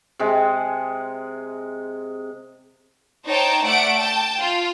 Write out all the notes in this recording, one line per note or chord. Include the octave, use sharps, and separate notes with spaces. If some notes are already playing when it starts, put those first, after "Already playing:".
C3 G#3
D#4 C5 C#5 G5 A5
A3 D5 F#5 D7
G5 A5
F4